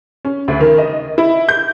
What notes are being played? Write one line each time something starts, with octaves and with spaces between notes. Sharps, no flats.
C#4
D2
D#3
D#5
E4
G6